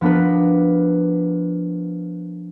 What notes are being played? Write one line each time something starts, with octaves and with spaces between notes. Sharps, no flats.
F3 B3 D4 A#4 B4